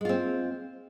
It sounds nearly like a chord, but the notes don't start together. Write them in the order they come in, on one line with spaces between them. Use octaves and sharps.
G#3 F4 C4